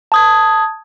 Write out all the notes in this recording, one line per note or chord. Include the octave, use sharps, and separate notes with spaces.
A5 D#6 G#6